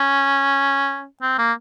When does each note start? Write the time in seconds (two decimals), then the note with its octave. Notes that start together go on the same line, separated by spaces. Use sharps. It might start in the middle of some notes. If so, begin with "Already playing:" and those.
Already playing: C#4
1.22 C4
1.38 A#3